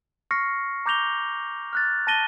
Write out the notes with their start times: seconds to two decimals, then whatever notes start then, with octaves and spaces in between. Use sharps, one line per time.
0.31 C#6 F6 A#6 C7 C#7
0.86 A#5 D6 G6 A#6 F7 G7
1.73 F6 F#6 A6
2.07 A5 A6 A#6 D#7 G7